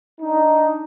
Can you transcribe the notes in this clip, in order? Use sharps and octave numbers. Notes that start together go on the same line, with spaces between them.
D4 D#4